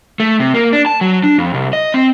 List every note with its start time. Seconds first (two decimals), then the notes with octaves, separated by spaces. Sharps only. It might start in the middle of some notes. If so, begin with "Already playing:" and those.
0.20 A3
0.40 C3
0.54 A#3
0.73 D4
0.86 A5
1.01 F#3
1.24 D4
1.38 F2
1.54 C2
1.73 D#5
1.94 C4